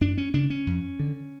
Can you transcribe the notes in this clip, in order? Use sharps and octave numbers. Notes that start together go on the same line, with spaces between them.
F#2 D4
C#4
C#3 D4
C#4
F2
D3